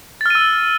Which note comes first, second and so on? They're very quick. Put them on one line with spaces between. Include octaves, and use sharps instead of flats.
A6 F6 D#7 E6